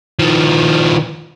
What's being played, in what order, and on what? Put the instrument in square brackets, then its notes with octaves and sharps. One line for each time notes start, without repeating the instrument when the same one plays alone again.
[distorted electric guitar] D#3 F3